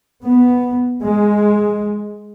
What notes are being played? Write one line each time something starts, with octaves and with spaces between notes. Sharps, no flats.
B3
G#3